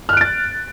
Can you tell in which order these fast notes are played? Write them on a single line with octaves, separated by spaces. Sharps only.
F6 F#6 D7 A6